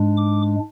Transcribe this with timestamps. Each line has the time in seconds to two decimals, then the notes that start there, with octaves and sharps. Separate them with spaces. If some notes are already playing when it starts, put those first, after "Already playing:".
Already playing: G#2 G#3 D4
0.17 D6